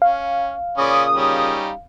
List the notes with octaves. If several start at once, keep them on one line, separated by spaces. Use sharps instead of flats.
C#4 F5
A#2 C#3 C#4 D5 B5 D#6
G3 C#4 D#4